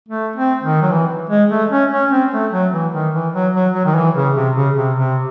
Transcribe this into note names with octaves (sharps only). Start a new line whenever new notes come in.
A3
C4
D#3
F#3
E3
G#3
A3
C#4
C#4
C4
A3
F#3
E3
D#3
E3
F#3
F#3
F#3
D#3
E3
C#3
C3
C#3
C3
C3